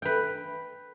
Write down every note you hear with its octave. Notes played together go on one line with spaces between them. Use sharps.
B4 G5